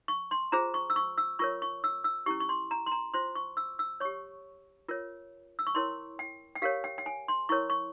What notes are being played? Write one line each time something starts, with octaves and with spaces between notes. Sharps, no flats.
C#6
C6
F4 G#4 C5 A#5
C#6
E6
C#6
E6
F4 A#4 C#5 C#6
C#6
E6
E6
C#4 E4 G4 C#6
C#6
C6
A#5
C6
A#5
F4 C5 C6
C#6
E6
E6
G4 C#5 C#6
F4 A#4 C#5
E6
C#6
E4 A#4 C#5 C6
G5
G5
G4 A#4 C#5 F5
G5
G5
G#5
C6
E4 A#4 C#5 C#6
C#6